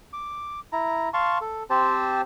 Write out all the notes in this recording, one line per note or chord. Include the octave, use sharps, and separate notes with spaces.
D6
E4 A#5
F5 A5 C6 C#6
A4
C4 G4 C5 A5